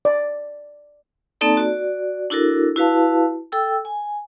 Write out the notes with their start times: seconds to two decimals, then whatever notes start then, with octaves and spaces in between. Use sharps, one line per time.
0.05 D5
1.41 A#3 C4 D#4 A4 D5 A5
1.57 F#4 D5
2.30 D4 E4 F#4 A4 A#4
2.76 E4 F#4 B4 F5 A5
3.52 A4 G5 E6
3.85 G#5